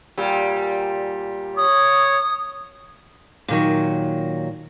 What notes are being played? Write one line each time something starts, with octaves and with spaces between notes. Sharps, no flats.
A#2 G3
C#5 D#6
A#2 D#3 F#3